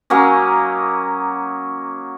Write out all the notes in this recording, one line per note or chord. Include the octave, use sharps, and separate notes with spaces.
F#3 A#3 C#4 D#5